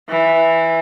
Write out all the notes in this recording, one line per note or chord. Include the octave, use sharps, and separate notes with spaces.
E3